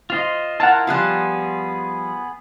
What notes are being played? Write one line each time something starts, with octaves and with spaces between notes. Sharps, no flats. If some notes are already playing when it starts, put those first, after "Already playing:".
F4 C5 D#5
E4 F4 A#4 F#5 A5
F3 G3 B3 F4 G#4 F#6